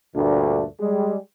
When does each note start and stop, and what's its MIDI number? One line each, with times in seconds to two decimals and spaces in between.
0.16 0.65 38
0.16 0.65 43
0.16 0.65 46
0.16 0.65 57
0.16 0.65 62
0.80 1.16 55
0.80 1.16 56